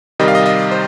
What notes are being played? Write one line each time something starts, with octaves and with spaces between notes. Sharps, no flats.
C3 D#3 G3 D#5
F5
D#5
D#5
C5